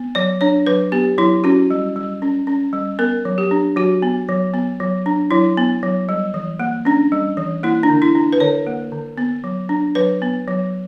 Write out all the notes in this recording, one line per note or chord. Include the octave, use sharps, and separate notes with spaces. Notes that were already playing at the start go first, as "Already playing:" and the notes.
Already playing: B3
F#3 D5
D4 C#5
F#3 B4
B3 G4
F#3 E4
C#4 F#4
G3
G3
C#4
C#4
G3
B3 A#4
F#3
G4
D4
F#3 F#4
B3
F#3
B3
F#3
D4
F#3 E4
B3
F#3
G3
E3
A#3
C#4 D4
G3
E3
A#3 E4
D4
D3
E4
D4
B4
D3 C#5
A#3
D3
B3
F#3
D4
F#3 B4
B3
F#3